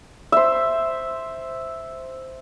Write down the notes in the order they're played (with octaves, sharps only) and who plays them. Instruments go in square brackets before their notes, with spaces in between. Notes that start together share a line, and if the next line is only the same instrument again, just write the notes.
[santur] C5 E5